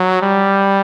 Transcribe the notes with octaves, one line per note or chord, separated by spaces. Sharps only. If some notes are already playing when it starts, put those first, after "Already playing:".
Already playing: F#3
G3